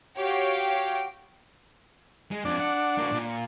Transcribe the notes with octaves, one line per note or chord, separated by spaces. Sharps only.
F#4 G4 C#5 F5 G5
G#3
F2 D4
F#5
A#3 F#4
A#2